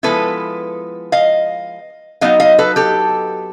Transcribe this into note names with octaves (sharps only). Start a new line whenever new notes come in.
F3 G#3 B3 E4 A4 B4
D#5 F5
F#3 B3 D#4 D#5 F5
D#5 F5
A4 B4
G4 A4